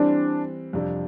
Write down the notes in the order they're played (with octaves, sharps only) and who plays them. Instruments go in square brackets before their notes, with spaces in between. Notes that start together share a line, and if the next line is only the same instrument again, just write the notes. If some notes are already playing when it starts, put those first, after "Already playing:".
Already playing: [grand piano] E3 G3 C4 [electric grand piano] D4
[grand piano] F2 C3 G3 D4 F4